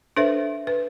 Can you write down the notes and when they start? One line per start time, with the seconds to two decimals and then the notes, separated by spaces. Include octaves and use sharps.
0.17 D4 A4 B4 C5 E5
0.67 B4